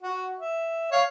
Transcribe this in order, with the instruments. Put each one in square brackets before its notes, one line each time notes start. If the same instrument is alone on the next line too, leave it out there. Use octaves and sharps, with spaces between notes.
[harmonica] F#4
E5
C#5 F5